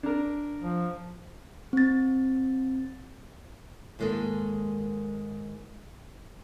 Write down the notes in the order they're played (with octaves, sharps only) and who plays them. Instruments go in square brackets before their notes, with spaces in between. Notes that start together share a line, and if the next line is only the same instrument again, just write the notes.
[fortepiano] D4 A#4
[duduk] F3
[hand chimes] C4 A6
[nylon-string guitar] G#2 D#3 G#3 A#3 A4